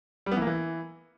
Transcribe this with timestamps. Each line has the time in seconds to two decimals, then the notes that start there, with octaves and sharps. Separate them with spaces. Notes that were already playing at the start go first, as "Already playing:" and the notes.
0.26 G3
0.31 B3
0.37 E3
0.42 A#3
0.47 E3